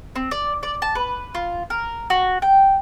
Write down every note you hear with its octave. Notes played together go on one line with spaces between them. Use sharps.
C4
D5
D5
A5
B4
F4
A#4
F#4
G5